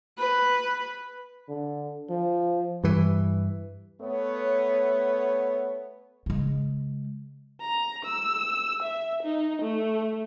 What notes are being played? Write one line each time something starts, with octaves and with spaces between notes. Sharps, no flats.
B4
D3
F3
G2 E3
A3 B3 B4 C#5
C#3 G#3
A#5
E6
E5
D#4
A3